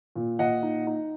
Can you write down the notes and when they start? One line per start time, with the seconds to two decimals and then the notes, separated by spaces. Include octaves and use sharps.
0.15 A#2
0.39 A#2 D#5 F#5
0.63 D#4
0.87 D#4